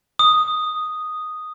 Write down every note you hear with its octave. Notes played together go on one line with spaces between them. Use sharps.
D#6